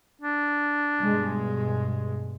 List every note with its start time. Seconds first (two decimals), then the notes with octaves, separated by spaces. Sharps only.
0.21 D4
1.04 G2 B2 G#3